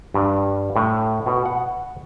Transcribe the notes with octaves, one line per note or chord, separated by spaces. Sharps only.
G2
A2
B2
F#5